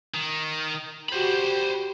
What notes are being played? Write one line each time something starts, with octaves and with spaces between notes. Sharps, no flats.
D#3
F#4 G4 C5 B5